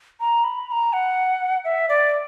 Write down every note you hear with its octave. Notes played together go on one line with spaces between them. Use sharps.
A#5
B5
B5
A#5
F#5
E5
D5